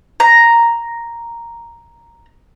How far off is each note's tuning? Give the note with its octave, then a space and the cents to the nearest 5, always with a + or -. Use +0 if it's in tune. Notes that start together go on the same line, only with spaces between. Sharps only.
A#5 +0